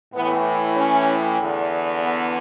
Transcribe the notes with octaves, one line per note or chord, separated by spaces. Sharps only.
A2 E3 B3
C#4
E2 D3
B3